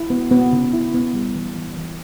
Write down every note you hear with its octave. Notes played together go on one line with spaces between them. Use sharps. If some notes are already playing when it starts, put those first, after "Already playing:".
Already playing: E4
B3
B3
C#3
E4
B3
G3
E3
E3
E3